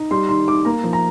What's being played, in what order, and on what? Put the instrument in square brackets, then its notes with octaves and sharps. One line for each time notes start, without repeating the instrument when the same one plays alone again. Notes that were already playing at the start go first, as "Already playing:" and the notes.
Already playing: [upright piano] D#4
G3 C6
D#3 C6
D#3 D6
A#3 A#5
F3
A#5